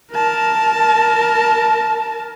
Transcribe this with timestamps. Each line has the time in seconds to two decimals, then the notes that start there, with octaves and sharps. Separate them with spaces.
0.12 A#4 A5